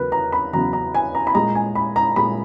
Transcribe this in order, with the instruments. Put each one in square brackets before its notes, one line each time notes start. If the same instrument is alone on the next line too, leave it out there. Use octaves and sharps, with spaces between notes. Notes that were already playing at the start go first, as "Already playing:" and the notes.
Already playing: [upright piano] E2 C#3 F#3 A#4 B4
A#5
B5
E2 C#3 F#3 A#5
A#5
G#5
A#5
B5
A#2 G#3 A#5
G#5
B5
A#5
A#2 G#3 B5